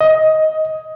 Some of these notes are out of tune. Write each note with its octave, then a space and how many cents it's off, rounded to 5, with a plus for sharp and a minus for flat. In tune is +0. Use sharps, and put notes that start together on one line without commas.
D#5 +15